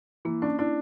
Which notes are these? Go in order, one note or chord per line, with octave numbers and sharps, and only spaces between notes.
E3 A#3
C#4 D4
D4 E4